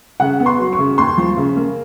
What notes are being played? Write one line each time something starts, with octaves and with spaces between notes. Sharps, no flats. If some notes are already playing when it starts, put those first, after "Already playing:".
C#3 F#5
B3
C6
F#3
C#6
C#3
D#2 C6
F3
C#3
A#3